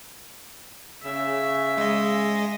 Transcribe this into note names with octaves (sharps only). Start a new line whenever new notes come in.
C#3 E5
G#3 D#5